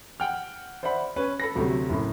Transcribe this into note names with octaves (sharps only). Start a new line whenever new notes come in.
F#5 G5 F6
C5 D5 E5 F#5 B5
C#4 B4
A4 B5 A#6
D2 C3 F#3 A3
F#1 A2